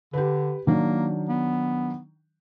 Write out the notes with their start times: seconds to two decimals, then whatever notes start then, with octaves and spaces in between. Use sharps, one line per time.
0.13 D3 G4 B4
0.67 D#3 F#3 A#3 D4
1.29 B3